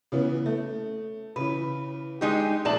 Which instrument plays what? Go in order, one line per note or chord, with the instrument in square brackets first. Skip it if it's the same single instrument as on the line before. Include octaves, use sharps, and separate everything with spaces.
[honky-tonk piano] C#3 E3 B3
A3
[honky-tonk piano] C#3 E3 [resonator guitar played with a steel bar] B4
[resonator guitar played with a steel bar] G#3 D#4 G4
[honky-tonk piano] A#1 E5 F#7 [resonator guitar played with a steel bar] G#3 D5 A5